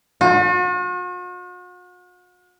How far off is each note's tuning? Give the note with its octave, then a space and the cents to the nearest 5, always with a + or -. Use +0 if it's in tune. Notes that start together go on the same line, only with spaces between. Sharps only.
F#4 -45